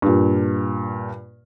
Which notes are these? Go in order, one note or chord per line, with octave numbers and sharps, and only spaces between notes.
G2 A#2